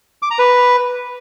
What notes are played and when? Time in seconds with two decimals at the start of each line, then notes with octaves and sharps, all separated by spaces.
0.22 D6
0.31 A#5
0.39 B4